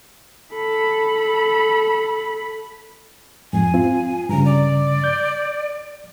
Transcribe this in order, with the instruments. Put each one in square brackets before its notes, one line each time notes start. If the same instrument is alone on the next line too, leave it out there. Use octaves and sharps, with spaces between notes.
[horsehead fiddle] A4 B5
[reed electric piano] F2 G#2 [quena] G#5
[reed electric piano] C4 F4
[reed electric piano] G2 C#3 [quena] A#5
[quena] D5
[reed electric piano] G6